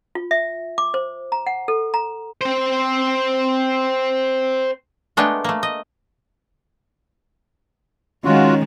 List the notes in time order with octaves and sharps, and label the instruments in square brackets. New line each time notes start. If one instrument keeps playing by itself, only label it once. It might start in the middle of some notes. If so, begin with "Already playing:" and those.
[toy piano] F4
E5
D6
C5
A#5
F#5
A4
A#5
[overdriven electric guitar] C4 C5
[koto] G#3 A3 B3 D4 A#4 G5
A3 A#3
D#5
[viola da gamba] D#3 G#3 [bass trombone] C#4 [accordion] F4 F#4